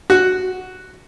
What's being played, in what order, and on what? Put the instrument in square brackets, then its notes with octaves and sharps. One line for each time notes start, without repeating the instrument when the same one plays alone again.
[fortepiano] F#4